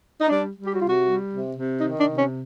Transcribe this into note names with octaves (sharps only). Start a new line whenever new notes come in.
D#4
G3 D4
G3
G4
F#4
C3 F4
F#4
G3
C3
C3
D#3 D#4
D4
C3
C#4